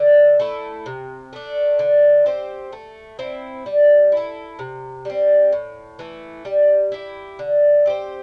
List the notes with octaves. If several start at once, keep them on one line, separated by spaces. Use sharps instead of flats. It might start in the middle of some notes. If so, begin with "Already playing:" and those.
Already playing: D3
A3 E4 A4
C3
A3 D4
D3
C4 G4 C5
A3
C4 E4
G3
E4 A4
C3
G3 C4
A2
E3 A3
G3
E4 G4
D3
C4 G4 C5